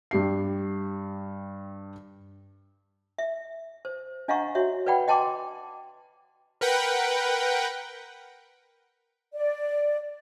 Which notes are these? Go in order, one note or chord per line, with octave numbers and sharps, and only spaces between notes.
G2 G4 C7
E5
C5
D4 D#5 F5 F#5 A#5 C#6
F#4 C#5 E5
B4 D5 F#5 G5 B5
D#5 G5 A5 C6 D6
A#4 B4 F#5 G5
D5